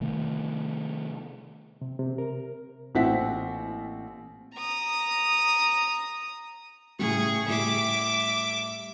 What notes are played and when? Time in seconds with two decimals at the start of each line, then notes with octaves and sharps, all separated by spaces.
0.01 C3 D#3 A3
1.82 C3
1.99 C3
2.18 A#4
2.95 A1 A#2 C4 E5 F#5 B6
4.56 A#5 D#6
6.99 A2 C#3 G3 G#4 C#6
7.48 A2 G3 E5 D6